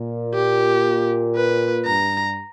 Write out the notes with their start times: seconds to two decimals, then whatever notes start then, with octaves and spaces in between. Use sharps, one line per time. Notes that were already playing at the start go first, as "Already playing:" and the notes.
Already playing: A#2
0.34 G4
1.36 B4
1.86 G2 A#5